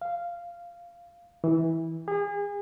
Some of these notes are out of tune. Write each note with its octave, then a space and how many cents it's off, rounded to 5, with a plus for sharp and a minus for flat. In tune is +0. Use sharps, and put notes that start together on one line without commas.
F5 -10
E3 -20
G#4 -35